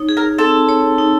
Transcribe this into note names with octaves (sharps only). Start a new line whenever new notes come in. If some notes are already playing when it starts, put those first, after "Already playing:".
Already playing: D#4 C#5
G#4
A#4
C4 A4
C#5
D#4